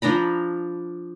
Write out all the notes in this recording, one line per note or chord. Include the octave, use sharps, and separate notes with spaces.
F3 D4 A#5 B5